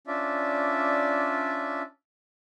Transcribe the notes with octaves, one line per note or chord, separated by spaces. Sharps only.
C#4 D4 F4 D5 E5